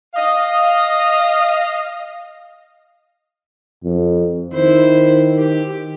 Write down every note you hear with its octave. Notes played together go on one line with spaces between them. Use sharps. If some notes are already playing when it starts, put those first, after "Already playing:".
D#5 F5
F2
D#3 E4 C5
G4